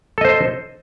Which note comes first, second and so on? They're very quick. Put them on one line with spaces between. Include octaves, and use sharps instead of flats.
A4 D#5 C5